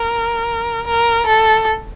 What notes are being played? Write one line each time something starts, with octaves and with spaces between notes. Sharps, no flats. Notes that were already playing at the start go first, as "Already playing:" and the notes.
Already playing: A#4
A#4
A4